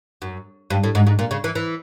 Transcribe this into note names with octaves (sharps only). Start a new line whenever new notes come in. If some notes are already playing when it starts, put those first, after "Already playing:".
F#2
G2
A2
G#2
G#2
A#2
C#3
E3
E3